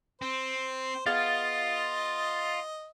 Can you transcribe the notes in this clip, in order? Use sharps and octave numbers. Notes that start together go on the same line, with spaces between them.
C4 C5
B3 F4 G#4 D#5 F5 A6